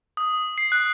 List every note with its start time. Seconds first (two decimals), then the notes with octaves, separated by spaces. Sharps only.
0.17 D#6
0.58 C7
0.72 F#6